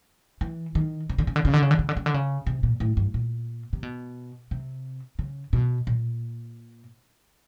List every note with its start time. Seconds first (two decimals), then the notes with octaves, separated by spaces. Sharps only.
0.41 E3
0.75 D#3
1.10 C#3
1.18 D3
1.27 C#3
1.36 D3
1.45 C#3
1.53 D3
1.62 C#3
1.71 D3
1.79 C#3
1.89 D3
1.97 C#3
2.06 D3
2.14 C#3
2.47 C3
2.63 A#2
2.80 A2
2.97 G2
3.14 A#2
3.73 C3
3.83 B2
4.51 C3
5.19 C#3
5.53 B2
5.87 A#2